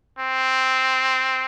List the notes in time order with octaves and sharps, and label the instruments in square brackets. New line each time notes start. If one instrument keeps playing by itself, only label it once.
[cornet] C4